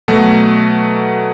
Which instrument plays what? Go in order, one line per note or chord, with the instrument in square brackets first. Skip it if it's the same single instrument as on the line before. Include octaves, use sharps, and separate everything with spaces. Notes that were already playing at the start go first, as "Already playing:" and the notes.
[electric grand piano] B2 F#3 A3